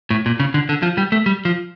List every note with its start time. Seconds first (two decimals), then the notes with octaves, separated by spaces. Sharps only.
0.10 A2
0.26 A#2
0.40 C#3
0.54 D3
0.69 D3
0.82 F3
0.98 G3
1.12 A3
1.26 G3
1.45 F3